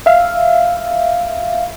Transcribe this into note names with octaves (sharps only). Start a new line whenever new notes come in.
E5 F5